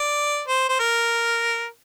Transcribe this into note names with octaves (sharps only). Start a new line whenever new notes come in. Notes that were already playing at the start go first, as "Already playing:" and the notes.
Already playing: D5
C5
C5
A#4